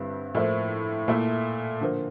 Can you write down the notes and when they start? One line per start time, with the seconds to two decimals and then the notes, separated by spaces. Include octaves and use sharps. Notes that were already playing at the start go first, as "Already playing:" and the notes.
Already playing: G2 D3 G3 C4 E4
0.35 A2 F3 A#3 E4
1.08 A#2 A3 E4
1.81 D3 F3 A#3